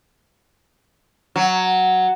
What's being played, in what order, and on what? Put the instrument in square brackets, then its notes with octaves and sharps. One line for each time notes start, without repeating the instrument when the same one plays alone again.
[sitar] F#3